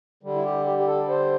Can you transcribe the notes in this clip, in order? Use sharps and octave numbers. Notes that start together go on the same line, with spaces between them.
D3 G3
E4
G4
G4
G4
A4
C5